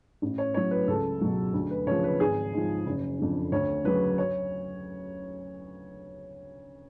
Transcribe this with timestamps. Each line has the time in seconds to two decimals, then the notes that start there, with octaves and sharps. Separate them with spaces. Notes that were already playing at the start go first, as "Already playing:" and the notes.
0.22 A1
0.38 C#5
0.54 A2 F#3 C#5
0.71 B4
0.88 C#2 A4
1.21 B2 F#3
1.54 D2
1.71 B4
1.86 C#3 F3 C#5
2.04 B4
2.20 G#1 G#4
2.53 G#2 F3
2.86 F#1
3.19 F2 D3
3.52 D2 C#5
3.84 C#3 F#3 B4
4.18 C#5